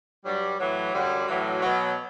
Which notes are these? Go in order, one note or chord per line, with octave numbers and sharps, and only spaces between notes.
G2 F#3 G3
A2 E3 F#3
F#2 D3 F#3 G3
A2 E3 F#3
B2 F#3